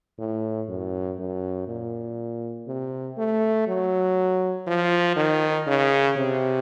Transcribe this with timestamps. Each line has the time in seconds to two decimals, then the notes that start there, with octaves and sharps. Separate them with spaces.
0.18 A2
0.69 F#2
1.19 F#2
1.67 A#2
2.67 C3
3.18 A3
3.67 F#3
4.67 F3
5.16 D#3
5.67 C#3
6.17 C3